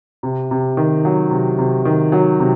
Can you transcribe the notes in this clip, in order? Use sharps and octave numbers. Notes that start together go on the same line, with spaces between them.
C3
C3
D#3
F#3
C3
C3
D#3
F#3
C3